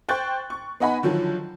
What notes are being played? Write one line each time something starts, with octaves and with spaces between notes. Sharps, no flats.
C5 G5 C#6 F#6 A6
C#6
B3 D#4 D#5 F#5 G#5 B5
D3 D#3 F3 F#3